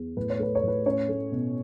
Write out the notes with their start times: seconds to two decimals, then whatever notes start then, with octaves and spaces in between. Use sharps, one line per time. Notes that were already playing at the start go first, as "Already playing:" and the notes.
Already playing: E2
0.17 A2 B4
0.30 C#5
0.39 A3 B4
0.55 C#5
0.63 A2 B4
0.86 C#4 C#5
1.08 A3
1.32 B2